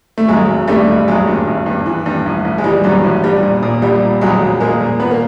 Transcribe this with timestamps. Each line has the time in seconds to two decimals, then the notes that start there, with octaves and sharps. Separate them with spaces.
0.18 A3
0.28 G#1 F#3 G#3
0.48 G#1
0.68 G2 G3 A3
0.87 G#1
1.07 G#1 F#3 G#3
1.27 G2
1.47 G#1
1.66 G2
1.86 E3
2.06 G2
2.26 A1
2.45 A1
2.58 G#3
2.64 E3 G3
2.84 G2 F#3
3.04 A1
3.24 G2 G3
3.43 A#2
3.63 A#2
3.82 A#1 G3
4.02 A#2
4.21 A#1 F#3 G#3
4.42 A#1
4.60 A#2 G#3 A#3
4.81 A#2
5.00 A#2 B3
5.11 A#3